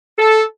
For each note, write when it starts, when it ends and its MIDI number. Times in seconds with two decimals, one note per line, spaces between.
0.18 0.43 69